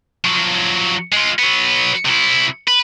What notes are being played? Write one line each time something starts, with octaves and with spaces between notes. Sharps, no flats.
F3 F#3
G#3 F4
F#3 B3
C3 E4
B4